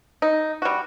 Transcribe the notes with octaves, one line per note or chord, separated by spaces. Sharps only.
D#4
G3 F#4